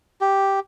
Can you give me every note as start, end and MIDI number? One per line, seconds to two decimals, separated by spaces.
0.21 0.60 67